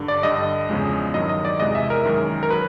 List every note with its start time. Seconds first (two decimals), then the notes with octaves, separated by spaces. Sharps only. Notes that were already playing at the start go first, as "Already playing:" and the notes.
Already playing: G2 D3
0.08 D5
0.23 G2 D3 G3 D#5
0.69 E2 C#3 F3 G#3
1.14 G2 D#3 F#3 D#5
1.29 D#5
1.45 D5
1.60 E2 C3 E3 G#3 D#5
1.75 E5
1.90 A#4
2.05 F#2 D#3 G#3
2.43 A#4
2.51 F#3 B4